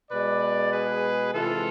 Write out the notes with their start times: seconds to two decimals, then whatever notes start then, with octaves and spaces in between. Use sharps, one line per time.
0.11 B2 G#3 B4 D5
0.72 G#4 B4
1.33 C3 E3 G#3 F4 A4